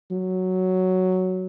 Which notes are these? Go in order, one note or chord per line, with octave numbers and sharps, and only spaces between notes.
F#3